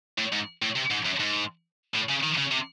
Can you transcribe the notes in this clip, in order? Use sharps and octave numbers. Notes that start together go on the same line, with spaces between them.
A2
G#2
A2
C3
G#2
F#2
G#2
A2
C#3
D#3
C#3
C3